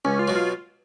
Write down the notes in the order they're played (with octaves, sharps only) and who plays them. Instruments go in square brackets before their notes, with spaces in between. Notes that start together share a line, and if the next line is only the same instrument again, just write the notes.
[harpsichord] C#2 [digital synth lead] C#4
[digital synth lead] F4
[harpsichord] B2 F#3
[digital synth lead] F4